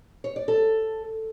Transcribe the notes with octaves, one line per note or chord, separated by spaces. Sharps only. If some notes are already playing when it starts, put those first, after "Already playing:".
C#5
D5
A4